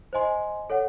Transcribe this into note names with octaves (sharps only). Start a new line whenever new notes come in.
C5 D#5 G#5 C6
A4 C#5 F#5